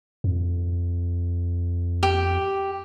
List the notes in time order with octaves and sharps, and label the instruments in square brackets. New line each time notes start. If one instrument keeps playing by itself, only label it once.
[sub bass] F2
[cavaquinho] G4